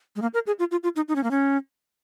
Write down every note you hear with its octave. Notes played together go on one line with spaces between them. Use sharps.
G#3
A#3
A#4
G#4
F4
F4
F4
D#4
D#4
C#4
A#3
C#4